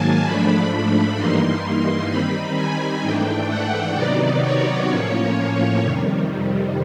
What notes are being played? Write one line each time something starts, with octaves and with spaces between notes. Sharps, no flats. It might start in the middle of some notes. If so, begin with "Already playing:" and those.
Already playing: G#2 D#3 F#3 A#3 G#5 A5
G#2 F3 A3 D4 B5
B5
G2 E3 G3 A#3 D#4 C6
D#3 G3 C4 D#4 B5
G#5
G#2 E3 A3 D4 G5
F#5
C3 D#3 F#3 B3 D#4 D5
C#5
A2 F3 A#3 C#4
F2 C3 D#3 G3